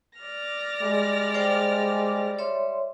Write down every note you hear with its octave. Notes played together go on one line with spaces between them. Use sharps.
D5 F6 A#6
G3 G#3
C5 G5 D6
C#5 E5 C6